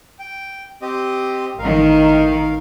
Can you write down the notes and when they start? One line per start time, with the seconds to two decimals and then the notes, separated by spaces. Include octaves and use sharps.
0.19 G5
0.82 C4 G4 D#5
1.59 A1 D#3 A#4 F5